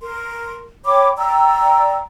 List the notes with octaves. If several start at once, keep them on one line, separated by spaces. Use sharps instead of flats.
A#4 C6
C#5 G5 B5 D6
D5 G5 A#5 E6